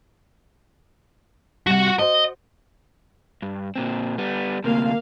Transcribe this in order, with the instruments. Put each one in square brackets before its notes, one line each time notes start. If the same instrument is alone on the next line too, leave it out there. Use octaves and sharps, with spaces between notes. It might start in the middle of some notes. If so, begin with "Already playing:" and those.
[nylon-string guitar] C3 G3 [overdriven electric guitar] F#4 F#5
[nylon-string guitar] F#4 C5 [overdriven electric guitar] D#5
[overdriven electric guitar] G2
A#2 C4
G3 B3
[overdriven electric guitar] D2 C3 [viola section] A#3 F5